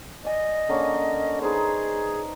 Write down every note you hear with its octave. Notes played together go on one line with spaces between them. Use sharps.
D5 D#5 G#5
D3 A#3 C#4
D#4 G#4 B4 C5